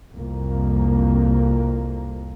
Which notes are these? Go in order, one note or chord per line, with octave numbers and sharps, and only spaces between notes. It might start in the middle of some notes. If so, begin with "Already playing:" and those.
C2 F2 A#3